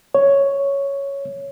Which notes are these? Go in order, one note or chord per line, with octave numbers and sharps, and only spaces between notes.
C#5